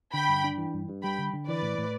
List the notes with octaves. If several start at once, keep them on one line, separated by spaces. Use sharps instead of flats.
D3 G5 B5
G2
D4
E3
G2
G2
G3 G5 B5
D3
D3
E3 B4 D5
A2
A2